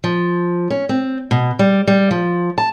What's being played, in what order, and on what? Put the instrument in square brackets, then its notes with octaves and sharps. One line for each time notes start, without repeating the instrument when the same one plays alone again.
[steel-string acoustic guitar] F3
C#4
C4
B2
G3
G3
F3
A5